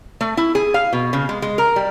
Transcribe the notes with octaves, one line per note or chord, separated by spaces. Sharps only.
A3
E4
G#4
F5
B2
C#3
G#3
G#3
A#4
G3